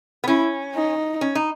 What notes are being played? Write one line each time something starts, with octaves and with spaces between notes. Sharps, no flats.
B3
C#4 E4
D#4
C#4
D#4